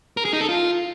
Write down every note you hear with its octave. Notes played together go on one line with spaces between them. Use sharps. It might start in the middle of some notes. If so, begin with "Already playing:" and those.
A#4
G#4
D#4
A4
F4